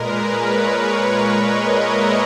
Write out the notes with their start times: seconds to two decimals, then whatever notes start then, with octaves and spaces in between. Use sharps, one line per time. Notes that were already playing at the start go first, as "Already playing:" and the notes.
Already playing: A#2 G#3 A#4 B4
0.29 C#5
1.23 D#5
1.71 E5